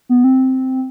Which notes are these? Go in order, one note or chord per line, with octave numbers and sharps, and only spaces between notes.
B3
C4